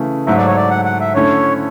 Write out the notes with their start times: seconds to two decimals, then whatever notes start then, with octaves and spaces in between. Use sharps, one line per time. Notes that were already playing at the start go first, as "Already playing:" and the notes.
Already playing: C#3 E3 A3
0.27 G#2 F#3 A3 E5
0.37 D5
0.47 C#5
0.56 D5
0.70 F#5
0.85 F#5
1.00 E5
1.15 D3 A3 C#4 E4 C#5